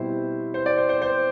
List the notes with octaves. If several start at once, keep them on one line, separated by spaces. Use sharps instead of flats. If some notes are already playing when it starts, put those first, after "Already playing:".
Already playing: B2 G3 C4 E4 C5
C5
D5
C5
C5
C5